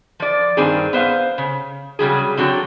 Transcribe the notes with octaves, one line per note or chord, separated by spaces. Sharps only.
F3 D5
G2 D#3 C4 G#4
B3 C5 D#5 F5
C#3
C#3 F#3 G3 G#4
D3 F#3 C4